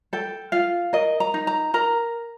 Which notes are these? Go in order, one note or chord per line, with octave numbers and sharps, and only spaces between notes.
A4 G5
F4 F5
A#4 D#5
A#5
D#4
A#5
A#4 A#5